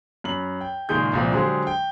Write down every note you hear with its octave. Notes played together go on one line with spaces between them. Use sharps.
F#2 B5 F#7
G5
F#1 A#2 D#3 G#3 G#4 G6
C2 A#2 F3
D3 F#3 G#3 G4 G#4 C5
G5